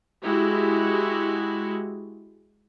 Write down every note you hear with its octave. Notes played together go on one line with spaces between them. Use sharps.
G#3 E4 F#4 G4